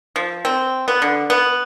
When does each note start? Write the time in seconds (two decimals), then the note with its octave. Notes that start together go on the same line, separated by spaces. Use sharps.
0.16 F3
0.45 C4
0.88 B3
1.02 D3
1.30 B3